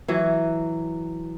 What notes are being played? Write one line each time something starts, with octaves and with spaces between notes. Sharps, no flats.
E3 F#3